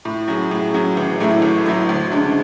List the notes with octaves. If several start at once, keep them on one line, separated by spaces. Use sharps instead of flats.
A2
F#3 C#4 G#4
A2
F#3 C#4 G#4
A1
A2 F#3 A3 E4
A1
A2 F#3 A3 E4
D2
C#3 G#3 D4